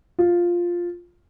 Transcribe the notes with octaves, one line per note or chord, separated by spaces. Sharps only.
F4